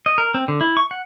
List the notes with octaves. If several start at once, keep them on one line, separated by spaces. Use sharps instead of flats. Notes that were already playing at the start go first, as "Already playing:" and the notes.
D#5
A#4
C4
D3
E4
C#6
F#5